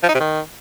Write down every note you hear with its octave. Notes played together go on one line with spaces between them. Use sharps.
F3
D#4
C3
D#3